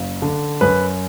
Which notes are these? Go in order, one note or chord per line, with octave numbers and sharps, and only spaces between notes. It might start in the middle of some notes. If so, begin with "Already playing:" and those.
Already playing: F#1
D3
F#2 B4